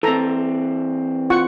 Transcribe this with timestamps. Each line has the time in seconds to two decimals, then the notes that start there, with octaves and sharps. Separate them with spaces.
0.03 E3 C4 A4 A#5
1.30 F4 F#5 C#6